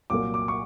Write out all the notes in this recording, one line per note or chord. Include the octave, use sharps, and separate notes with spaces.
C2 A#2 F#3 A#3 D6
D6
C#6